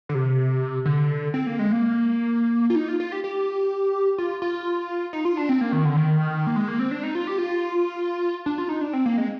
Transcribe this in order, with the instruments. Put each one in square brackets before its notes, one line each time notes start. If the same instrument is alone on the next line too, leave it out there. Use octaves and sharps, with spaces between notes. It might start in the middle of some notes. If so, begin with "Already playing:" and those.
[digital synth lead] D3
C3
D3
C4
A#3
G#3
A#3
F4
D#4
F4
F4
G4
G4
F4
F4
D#4
F4
D4
C4
A#3
D#3
D3
D#3
A#3
G#3
A#3
C4
D4
D#4
F4
G4
F4
D4
F4
D#4
D4
C4
A#3
G#3